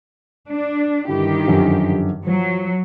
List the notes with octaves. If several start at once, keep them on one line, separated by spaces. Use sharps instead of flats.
D4
G2 D3 D#3 E4 G4
F#2 D3 F3
F3 F#3